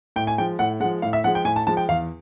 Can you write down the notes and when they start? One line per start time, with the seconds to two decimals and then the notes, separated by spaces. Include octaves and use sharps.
0.16 A2 G5
0.27 G#5
0.38 F3 G#3 G5
0.59 A2 F#5
0.80 G#3 F#5
0.84 F3
1.02 A2 F5
1.13 E5
1.24 F3 G#3 F#5
1.35 G5
1.45 A2 G#5
1.56 A5
1.67 F3 G#3 A5
1.77 G5
1.89 E2 F5